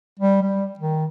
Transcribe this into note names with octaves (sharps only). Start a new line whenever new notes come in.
G3
G3
D#3